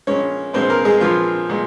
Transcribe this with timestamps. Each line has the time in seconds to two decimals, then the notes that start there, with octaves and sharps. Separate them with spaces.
0.07 A#1 A#2 G#3 C#4 C#5
0.53 A#1 A#2 G#3 C4 C5
0.70 A#3 A#4
0.85 G#3 G#4
1.01 A#1 A#2 F3 G#3 F4
1.49 A#2 G#3